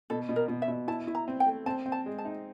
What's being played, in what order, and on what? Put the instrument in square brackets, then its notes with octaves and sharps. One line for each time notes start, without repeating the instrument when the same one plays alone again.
[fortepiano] B2 [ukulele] A4
[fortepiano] B2
[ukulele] A#4
[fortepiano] B2
[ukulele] E5
[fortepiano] B2
[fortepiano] E4 [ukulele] A5
[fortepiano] E4
[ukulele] A#5
[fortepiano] C4
[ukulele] G5
[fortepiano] A3
[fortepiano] C4 [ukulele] A5
[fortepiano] C4
[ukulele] A5
[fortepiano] G#3
[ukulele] A5
[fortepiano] D#4